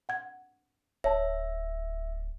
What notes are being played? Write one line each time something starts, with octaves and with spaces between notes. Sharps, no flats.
F#5 G#6
D1 C#5 E5 A5